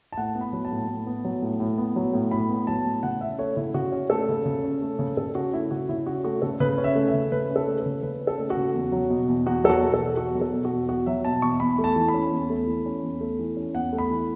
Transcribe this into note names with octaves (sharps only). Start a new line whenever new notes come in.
A5
A2 F#5
B3
B5
F#3
A5
A2
A2
B3
F#3
A2
A2
B3
F#3
A2
A2 B5
B3
F#3 A5
A2
C#3 F#5
C#4 E5
A3 C#5
C#3 E4
C#3 F#4
C#4
A3 A4
C#3
C#3
C#4
A3
C#3
C#3 A4
C#4 F#4
A3 E4
C#3 F#4
C#3 E4
C#4 F#4
A3 F#4
C#3 A4
C#3 B4
C#4
E5
A3
E5
C#3
C#3 B4
C#4
A4
A3
B4
C#3
C#3 B4
C#4
A4
A3
F#4
C#3
E2
F#3
B2
E2
E2 F#4
F#3 A4
F#4
B2
A4
E2
E2 F#4
F#3
A4
B2
F#4
E2
E2 F#4
F#3 E5
B2 A5
E2 C#6
E2 B5
A3
A5
E3
B5
C#4
E2
A3
E3
C#4
E2
A3
E3
C#4
E2 F#5
A3
B5
E3